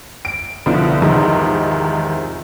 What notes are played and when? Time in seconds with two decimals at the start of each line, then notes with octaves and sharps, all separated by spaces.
0.25 D7
0.66 C2 B2 D3 F3
1.02 E2 G#2 C3 D#3 F3